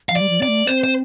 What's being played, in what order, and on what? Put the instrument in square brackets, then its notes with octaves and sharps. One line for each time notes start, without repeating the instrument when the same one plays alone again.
[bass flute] F3 [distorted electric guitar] F5
[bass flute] G3 [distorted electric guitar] D5
[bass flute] F3
[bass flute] C4 [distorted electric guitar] D5
[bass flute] A3
[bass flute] C4 [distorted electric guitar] C5
[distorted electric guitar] C5